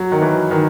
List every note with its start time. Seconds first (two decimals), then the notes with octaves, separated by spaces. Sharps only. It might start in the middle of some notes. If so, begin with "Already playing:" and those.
Already playing: F#3
0.12 D#3
0.22 E3
0.51 D#3